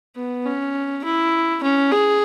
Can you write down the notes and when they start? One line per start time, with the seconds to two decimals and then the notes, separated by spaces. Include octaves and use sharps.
0.16 B3
0.45 C#4
1.04 E4
1.63 C#4
1.92 G#4